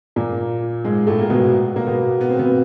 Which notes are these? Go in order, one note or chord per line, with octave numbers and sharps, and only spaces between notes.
A#2 A#3
G#2 G#3
A2 A3
A#3
B2 B3
A#3
B2 B3
B3
C4
B2 B3